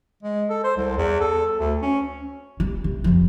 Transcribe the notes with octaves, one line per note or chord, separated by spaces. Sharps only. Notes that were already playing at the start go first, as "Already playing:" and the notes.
G#3
A4
C5
C2
E2
A4
D2
C#4
G3
C3
F2 F3